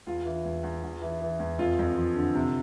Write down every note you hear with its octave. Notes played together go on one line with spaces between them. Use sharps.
E2 F4
E3
E2
E2
E2
E3
E3
E2
F2 F4
F2
F3
D3
C3